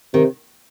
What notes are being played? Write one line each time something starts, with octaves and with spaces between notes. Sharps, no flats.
C3 D#3